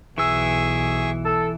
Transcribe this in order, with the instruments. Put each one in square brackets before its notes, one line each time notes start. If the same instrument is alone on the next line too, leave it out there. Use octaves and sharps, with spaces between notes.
[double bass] B1 [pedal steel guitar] E3 E6 [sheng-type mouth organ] G#4 E5 C#6
[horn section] A4